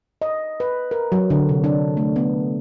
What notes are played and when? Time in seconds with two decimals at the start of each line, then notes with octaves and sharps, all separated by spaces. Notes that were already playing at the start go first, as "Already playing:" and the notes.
0.22 D#5
0.60 B4
0.91 A#4
1.12 F#3
1.30 D3
1.49 C3
1.64 D4
1.97 A3
2.16 B3